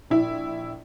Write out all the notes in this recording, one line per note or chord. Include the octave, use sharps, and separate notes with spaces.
A#1 E4